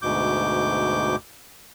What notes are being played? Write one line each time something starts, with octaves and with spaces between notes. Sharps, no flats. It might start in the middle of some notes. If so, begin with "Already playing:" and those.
D2 G#2 B2 D6 G6